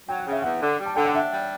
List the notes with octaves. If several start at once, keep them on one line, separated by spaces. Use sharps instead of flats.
F#3 G5
F#5
C#3 E5
E2 F#5
D3
G3
A5
D3 G5
F#5
D4 E5
G3